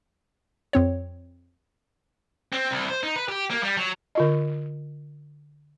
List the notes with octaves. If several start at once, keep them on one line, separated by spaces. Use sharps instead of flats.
F2 C4 C#5
C4
C2
C5
D#4
B4
G4
A#3
G3
F#3
D3 F4 D#5